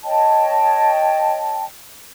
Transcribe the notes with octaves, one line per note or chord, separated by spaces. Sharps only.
C#5 D#5 G5 A5